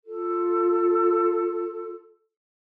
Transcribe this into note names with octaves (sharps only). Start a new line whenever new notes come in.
F4 A4